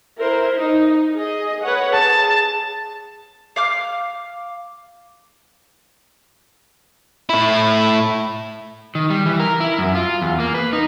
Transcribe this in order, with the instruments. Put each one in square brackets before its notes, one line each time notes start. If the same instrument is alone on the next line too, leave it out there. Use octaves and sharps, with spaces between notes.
[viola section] E4 A#4 C5
D#4
G#4 D#5
B4 C#5 F#5
[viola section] G#4 [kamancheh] A5
[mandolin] F5 D6 F6
[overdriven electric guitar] A2 E4
[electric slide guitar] D#3
G3
E3
A#4
E4
F#2
F4
E2
A#3
B4
D#4